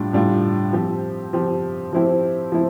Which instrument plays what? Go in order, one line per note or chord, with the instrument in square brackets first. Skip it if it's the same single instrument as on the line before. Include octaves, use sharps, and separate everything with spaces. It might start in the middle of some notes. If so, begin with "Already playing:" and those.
Already playing: [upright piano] A2 G3 D4 F4
A2 G3 D4 F4
F3 C4 G4
F3 C4 G4
F3 C4 E4 G4
F3 C4 E4